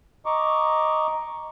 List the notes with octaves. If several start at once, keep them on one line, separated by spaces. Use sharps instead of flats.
D#5 A#5 C#6 D6